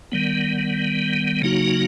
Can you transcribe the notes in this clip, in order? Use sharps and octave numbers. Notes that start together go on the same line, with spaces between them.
D#3 G3 B3
C#3 F#3 A#3 D#4 F#4